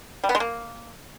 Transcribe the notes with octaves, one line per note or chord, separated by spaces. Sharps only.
G3
B3
G#3
A#3